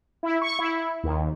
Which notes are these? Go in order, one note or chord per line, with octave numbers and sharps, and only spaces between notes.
E4
C#6
E4
D#2